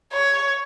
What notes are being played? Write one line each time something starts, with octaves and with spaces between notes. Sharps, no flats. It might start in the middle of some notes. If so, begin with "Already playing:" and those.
C#5